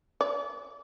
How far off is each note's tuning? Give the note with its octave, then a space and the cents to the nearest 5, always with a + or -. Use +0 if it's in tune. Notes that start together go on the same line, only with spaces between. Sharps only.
D5 -35